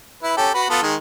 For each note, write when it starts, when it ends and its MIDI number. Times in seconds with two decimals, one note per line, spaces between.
0.23 0.36 64
0.23 0.36 71
0.37 0.50 61
0.37 0.50 67
0.37 0.50 69
0.54 0.70 66
0.54 0.70 71
0.70 0.81 59
0.70 0.81 65
0.70 0.81 69
0.82 0.95 51
0.82 0.95 56